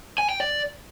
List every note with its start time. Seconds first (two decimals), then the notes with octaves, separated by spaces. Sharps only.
0.18 G#5
0.29 G5
0.40 D5